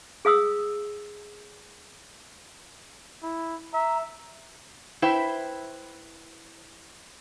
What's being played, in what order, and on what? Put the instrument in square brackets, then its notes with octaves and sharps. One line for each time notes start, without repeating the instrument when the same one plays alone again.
[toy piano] G#4 F5 D#6 E6
[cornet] E4
[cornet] E5 [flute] A#5
[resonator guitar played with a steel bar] E4 B4 C5 E5 G5